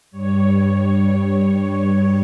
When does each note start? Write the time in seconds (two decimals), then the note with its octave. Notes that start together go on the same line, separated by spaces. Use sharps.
0.11 G2 G3 C#5
0.50 C#5